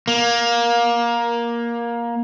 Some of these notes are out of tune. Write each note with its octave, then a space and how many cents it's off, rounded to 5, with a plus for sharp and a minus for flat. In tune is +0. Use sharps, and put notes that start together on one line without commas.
A#3 +15